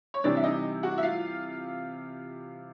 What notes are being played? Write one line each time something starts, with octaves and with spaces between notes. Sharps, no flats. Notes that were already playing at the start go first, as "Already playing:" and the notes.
C#5
C3 E3 G3 C4 D4 D5
E5
D#4 D#5
F#4 F#5
E5
F4 F5